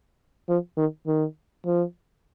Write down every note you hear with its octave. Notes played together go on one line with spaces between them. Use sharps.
F3
D#3
D#3
F3